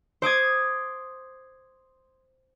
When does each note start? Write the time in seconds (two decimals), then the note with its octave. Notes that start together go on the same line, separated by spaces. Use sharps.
0.22 C5 D6 D#6 G#6